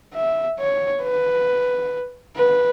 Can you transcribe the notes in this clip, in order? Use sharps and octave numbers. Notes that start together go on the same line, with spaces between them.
E5
C#5
B4
B4